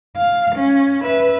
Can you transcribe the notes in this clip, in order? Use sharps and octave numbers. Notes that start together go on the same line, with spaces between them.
F5
C#4
B4 E5